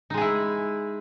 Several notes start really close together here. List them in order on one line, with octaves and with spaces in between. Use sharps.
D#4 G#3 G#4 E4